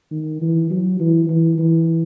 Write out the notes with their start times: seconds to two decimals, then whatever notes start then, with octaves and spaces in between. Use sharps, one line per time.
0.11 D#3
0.42 E3
0.70 F#3
1.00 E3
1.29 E3
1.58 E3